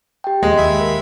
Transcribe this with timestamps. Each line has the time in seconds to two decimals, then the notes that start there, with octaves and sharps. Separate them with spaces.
0.24 G4 G5
0.43 D#2 G#3
0.58 D#2 E5 B5
0.80 A#4